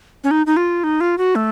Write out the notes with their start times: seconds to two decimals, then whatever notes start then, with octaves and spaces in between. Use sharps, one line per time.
0.24 C#4
0.31 D#4
0.46 D#4
0.57 F4
0.84 D#4
1.01 F4
1.18 F#4
1.35 A3